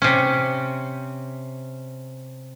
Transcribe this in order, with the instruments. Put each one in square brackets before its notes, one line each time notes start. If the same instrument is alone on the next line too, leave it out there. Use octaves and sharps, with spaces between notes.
[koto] C3 C#4